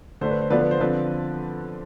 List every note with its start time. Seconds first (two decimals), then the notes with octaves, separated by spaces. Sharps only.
0.21 D3 A3 D4 C5
0.31 B4
0.41 C5
0.50 D3 F3 B3 D4 B4 D5
0.61 B4
0.71 C5
0.81 D3 F3 C4 B4 D5